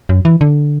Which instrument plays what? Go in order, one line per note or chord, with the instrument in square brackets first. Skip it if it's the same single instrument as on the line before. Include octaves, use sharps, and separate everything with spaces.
[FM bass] F#2
E3
D3